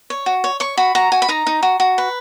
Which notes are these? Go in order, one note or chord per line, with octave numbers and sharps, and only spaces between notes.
C#5
F#4
C#5
C#5 C#6
F#4 B5
F#4 A#5
F#4 G#5
B5
D#4 A#5
D#4
F#4
F#4
B4